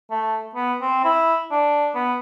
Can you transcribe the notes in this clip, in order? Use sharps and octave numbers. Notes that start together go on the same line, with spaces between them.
A3
B3
C4
E4
D4
B3